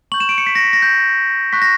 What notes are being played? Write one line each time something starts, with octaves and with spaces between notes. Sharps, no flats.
C#6 G6 F#7
E7
D7
C#7
B6
A#6
B6
A#6
G6
C#6 F#6 B6
A#6